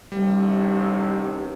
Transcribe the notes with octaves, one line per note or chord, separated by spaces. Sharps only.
A1 D#2 C3 G3